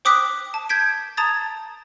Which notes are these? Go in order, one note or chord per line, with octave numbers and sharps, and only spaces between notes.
C5 G5 D6 D#6 F#6 B6
A5
G6 G#6 B6 D7
A5 A#5 D#6 G#6 A6